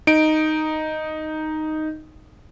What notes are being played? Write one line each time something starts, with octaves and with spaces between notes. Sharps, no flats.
D#4 D7